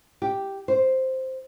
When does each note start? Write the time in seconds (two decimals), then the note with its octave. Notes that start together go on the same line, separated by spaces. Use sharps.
0.22 G4
0.68 C5